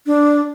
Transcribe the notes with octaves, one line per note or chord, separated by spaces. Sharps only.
D4